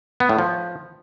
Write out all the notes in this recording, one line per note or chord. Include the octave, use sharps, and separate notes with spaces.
B3
A2
F3